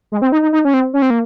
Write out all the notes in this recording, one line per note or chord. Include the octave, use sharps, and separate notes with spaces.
G#3
C4
D#4
D#4
D#4
C#4
C4
C#4
C4
A#3